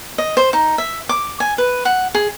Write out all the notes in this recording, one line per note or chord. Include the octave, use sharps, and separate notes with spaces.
D#5
C5
D#4
E5
D6
G#5
B4
F#5
G#4